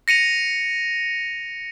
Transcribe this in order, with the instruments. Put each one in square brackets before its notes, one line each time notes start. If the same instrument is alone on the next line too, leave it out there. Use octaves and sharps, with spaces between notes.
[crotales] A#6 C#7 D#7 F7